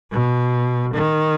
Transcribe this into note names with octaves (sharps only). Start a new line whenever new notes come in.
B2
D#3